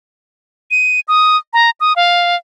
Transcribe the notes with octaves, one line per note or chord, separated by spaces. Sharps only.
D#7
D#6
A#5
D#6
F5